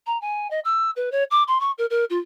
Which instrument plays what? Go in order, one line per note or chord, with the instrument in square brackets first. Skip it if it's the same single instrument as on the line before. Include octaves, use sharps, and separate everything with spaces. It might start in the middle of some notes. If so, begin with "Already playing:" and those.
[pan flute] A#5
G#5
D#5
E6
B4
C#5
D6
C6
C#6
A#4
A#4
F4